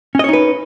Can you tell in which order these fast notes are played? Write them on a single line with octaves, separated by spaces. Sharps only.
C#4 D#5 C#5 D#4 B4